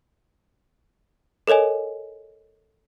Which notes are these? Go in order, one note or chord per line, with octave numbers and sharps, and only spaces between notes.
A4 A#4 C#5 D#5 G#5